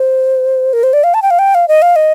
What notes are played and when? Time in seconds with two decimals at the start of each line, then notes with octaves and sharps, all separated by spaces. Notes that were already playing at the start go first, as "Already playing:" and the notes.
Already playing: C5
0.73 A#4
0.83 C5
0.93 D5
1.03 F5
1.14 A5
1.22 G5
1.30 F5
1.39 G5
1.55 F5
1.68 D#5
1.82 F5
1.96 D#5